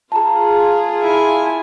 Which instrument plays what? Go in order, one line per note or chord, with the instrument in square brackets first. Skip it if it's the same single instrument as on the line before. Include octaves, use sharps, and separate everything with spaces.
[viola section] F4 G#4 [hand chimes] A5 A#5
[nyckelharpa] E4 G#5